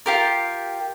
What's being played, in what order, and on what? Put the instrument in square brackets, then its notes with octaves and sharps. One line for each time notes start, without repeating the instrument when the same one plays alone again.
[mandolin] F4 G4 A#4